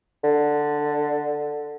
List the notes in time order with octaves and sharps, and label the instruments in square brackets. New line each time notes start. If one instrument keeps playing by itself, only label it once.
[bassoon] D3